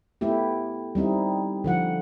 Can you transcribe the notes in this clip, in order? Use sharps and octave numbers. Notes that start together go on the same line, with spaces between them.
A3 B3 E4 G4
G3 C4 D#4 E4
D3 F3 F#5